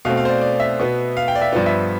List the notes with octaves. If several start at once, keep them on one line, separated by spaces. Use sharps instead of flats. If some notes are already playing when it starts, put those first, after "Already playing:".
B2 A3 C4 F5
F5
C5
D5
D5
E5
B2 B3
F5
G5
D5
E5
G2 F3 B3 D5
E5